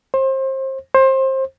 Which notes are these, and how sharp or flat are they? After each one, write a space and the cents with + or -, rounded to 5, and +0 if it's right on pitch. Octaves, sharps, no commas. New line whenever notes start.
C5 +30
C5 +25